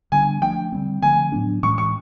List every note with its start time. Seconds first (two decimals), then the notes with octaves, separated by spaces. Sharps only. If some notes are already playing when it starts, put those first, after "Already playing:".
0.12 D3 G3 B3 D4 G#5
0.42 F3 A3 D4 G5
0.72 D3 G3 C4
1.02 D3 F3 A3 C4 G#5
1.32 A2 F#3 B3 D4
1.63 A2 E3 G#3 C#4 C#6
1.78 C#6